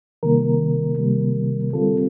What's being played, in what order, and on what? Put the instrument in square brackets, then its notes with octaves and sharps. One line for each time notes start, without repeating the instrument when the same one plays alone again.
[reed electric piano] C3 D#3 G3 A#3 A#4
C3 D#3 G3 A#3
D3 G3 C4 F4 A4